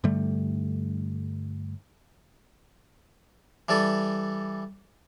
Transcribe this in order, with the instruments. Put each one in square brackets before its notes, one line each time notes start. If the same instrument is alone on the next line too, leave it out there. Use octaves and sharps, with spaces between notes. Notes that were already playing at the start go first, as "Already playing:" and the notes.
[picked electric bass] G2 D3 G3 A3
[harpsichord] E3 G3 A4